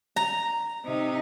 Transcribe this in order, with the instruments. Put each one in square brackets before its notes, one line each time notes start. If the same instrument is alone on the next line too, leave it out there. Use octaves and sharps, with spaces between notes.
[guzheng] A#5
[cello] C3 D#4